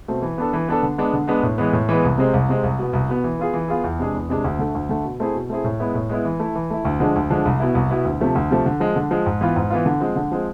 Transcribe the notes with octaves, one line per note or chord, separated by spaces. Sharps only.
B2 A3 C4
E3
B3 D4 A4
E3
B3 D4 A4
D3
G#3 B3 D4
D3
G#3 B3 D4
A2
E3 G#3 B3
A2
E3 G#3 B3
C2
C3 G#3 C4
C2
C3 G#3 C4
C2
B2 B3
C2
B2 B3
E3
B3 F4 G#4
E3
B3 F4 G#4
E2
C3 G#3 D4 G#4
E2
C3 G#3 D4 G#4
D2
D3 A3
D2
D3 A3
B2
A3 C4 E4 G#4
B2
A3 C4 E4 G#4
A2
G#3 B3 E4
A2
G#3 B3 E4
E3
A3 E4
E3
A3 E4
D2
D3 F3 G#3 D4
D2
D3 F3 G#3 D4
C2
B2 B3 E4
C2
B2 B3 E4
D2
C3 F3 A3
D2
C3 F3 A3
D3
F3 G#3
D3
F3 G#3
G#2
E3 B3 F4
G#2
E3 B3 F4
D3
F3 G#3 C4
D3
F3 G#3 C4